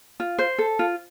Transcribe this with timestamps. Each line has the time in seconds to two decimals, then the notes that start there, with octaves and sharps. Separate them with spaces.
0.20 F4
0.38 C5
0.58 A4
0.79 F4